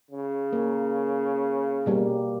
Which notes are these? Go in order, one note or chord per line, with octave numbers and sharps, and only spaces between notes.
C#3
A#3
B2 G3 A#3